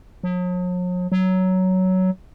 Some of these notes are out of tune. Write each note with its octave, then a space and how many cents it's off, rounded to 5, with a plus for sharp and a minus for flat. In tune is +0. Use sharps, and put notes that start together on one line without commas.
F#3 -45
F#3 +10